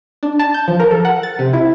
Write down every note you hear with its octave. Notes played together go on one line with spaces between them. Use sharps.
D4
A5
G6
F3
A#4
A4
F#5
A6
C3
E4